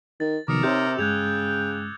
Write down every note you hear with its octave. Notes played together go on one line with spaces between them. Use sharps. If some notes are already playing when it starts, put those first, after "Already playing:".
D#3 A6
B1 C3 D#3 F3 A#4 D6 D#6 C#7
C3 D#4 C5 C#5 E6 G6
G2 C#3 G#3 G5 F#6 G#6 F7